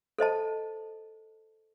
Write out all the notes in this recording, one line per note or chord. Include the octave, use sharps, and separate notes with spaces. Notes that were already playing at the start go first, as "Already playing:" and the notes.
A4 C5 D#5 A5